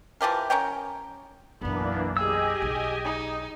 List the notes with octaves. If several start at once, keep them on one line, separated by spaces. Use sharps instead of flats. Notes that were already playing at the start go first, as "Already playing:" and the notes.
E3 F3 G4 A#4
C#4 A#4 C#5 G5
B1 F#2 E3 A#3 B3 D4
G4 G#4 D#5 G#5 E6
B1
D#4